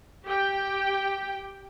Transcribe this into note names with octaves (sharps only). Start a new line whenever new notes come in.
G4 G5